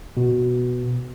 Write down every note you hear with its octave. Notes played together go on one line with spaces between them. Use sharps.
B2